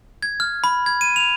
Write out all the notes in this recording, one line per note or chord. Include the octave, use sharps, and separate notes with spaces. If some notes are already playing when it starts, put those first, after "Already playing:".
G#6
F6
B5
G#6
D#7
F7